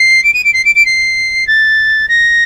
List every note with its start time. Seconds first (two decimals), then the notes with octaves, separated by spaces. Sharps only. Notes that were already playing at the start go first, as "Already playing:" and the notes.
Already playing: C7
0.24 D7
0.33 D#7
0.44 D7
0.53 C7
0.65 D7
0.75 D7
0.85 C7
1.47 A6
2.08 A#6